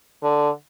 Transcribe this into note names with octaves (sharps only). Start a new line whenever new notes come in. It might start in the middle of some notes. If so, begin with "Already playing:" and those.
D3